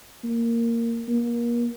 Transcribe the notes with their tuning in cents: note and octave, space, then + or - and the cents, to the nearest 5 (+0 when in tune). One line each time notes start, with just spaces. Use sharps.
A#3 -10
A#3 +30